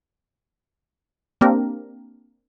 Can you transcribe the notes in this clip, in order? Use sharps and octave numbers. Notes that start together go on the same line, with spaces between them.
A#3 C4 D4 G4 A#4